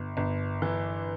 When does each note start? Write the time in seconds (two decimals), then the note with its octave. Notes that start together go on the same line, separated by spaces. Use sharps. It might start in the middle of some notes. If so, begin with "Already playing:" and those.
Already playing: G1
0.17 G1
0.62 E3